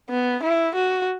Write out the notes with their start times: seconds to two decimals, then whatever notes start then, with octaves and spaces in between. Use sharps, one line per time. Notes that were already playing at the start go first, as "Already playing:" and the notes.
0.10 B3
0.43 E4
0.76 F#4